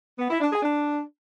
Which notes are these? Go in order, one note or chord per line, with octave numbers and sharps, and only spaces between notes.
B3
E4
D4
G#4
D4